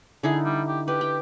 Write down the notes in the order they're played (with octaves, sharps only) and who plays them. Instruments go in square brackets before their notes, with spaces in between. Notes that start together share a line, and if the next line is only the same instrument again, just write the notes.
[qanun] D3 D#4 E4 [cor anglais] G#4
[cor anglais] G3
G4
[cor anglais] G4 [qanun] B4
[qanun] G5